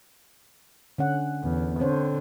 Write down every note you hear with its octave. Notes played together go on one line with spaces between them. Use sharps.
D3 C#4 F#5
E2
D3 C4 C5 C#5